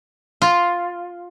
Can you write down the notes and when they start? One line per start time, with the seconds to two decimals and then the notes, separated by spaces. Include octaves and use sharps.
0.42 F4